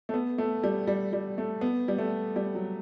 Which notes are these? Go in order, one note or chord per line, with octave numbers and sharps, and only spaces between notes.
A3
B3
A3
G3
G3
G3
A3
B3
G3
A3
G3
F#3